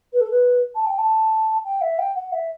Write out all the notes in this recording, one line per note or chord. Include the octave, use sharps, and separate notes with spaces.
B4
A4
B4
A5
G5
A5
G5
E5
G5
F#5
E5